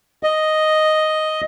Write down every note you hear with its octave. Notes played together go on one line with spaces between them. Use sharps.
D#5